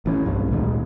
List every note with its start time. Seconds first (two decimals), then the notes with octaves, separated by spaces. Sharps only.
0.06 A1 E3 C#4
0.26 B1 G2
0.51 D2 A#2 D#3 G#3